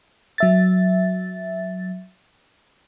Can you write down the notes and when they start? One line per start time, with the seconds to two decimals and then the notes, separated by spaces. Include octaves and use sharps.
0.38 F#3 E5 A6